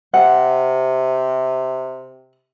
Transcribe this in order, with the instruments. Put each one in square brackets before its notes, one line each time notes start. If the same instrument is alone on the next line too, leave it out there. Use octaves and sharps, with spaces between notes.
[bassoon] C3 [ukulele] F#5